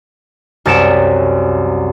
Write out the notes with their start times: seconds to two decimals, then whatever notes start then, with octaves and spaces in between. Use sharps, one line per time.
0.66 C2 F#2 A6 C#7 D7 E7